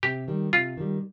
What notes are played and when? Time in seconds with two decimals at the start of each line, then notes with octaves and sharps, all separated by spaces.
0.03 C3 G4
0.28 D#3 G3
0.53 C3 F4
0.77 D#3 G3